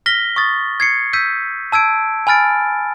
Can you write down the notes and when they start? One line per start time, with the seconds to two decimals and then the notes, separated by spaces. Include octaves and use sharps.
0.06 F6 A#6 B6 G7
0.36 C#6 D#6 A6
0.80 G#6 C7 C#7
1.13 E6 G6 B6 D#7
1.72 A5 E6 G#6 D7
2.27 G#5 B5 F6 A6 D7